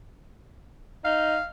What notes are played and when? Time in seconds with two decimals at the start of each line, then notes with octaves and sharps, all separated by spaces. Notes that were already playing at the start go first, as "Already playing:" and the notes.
1.05 D#4 F5